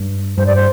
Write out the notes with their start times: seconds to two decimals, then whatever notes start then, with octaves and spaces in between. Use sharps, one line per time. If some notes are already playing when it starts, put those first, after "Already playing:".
Already playing: G2
0.37 G2 C5
0.46 D5
0.56 C5